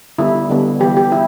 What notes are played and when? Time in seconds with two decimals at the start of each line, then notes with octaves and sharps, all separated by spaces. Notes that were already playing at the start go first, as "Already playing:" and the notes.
0.18 D3 G3 B3 E4
0.50 D3 G3 B3
0.80 E3 G3 B3 G4
0.97 G4
1.11 E3 E4